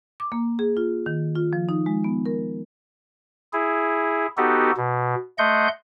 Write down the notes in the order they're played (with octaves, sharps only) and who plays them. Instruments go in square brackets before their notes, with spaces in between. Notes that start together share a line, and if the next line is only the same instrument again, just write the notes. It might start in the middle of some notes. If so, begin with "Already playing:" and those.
[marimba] D6
A#3
G#4
F4
D#3
F4
F3
D#4
G#3
B3
A#4
[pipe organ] E4 G#4
B3 D#4 F#4 G4 A4
B2
A3 D#5 F#5 C6 G6